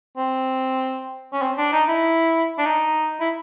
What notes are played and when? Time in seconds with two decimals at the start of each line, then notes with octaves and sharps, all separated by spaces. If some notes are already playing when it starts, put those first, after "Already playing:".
0.17 C4
1.33 C#4
1.42 C4
1.58 D4
1.73 D#4
1.88 E4
2.58 D4
2.66 D#4
3.20 E4